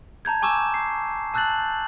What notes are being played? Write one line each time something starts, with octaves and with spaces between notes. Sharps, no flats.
A5 A#5 G6 G#6
G#5 C#6 D6 E6 E7
C7
A5 E6 F#6 G6 A6 F#7